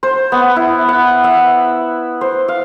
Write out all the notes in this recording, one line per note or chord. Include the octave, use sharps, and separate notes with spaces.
C5
B3
E4
F#5
E5
C5
F5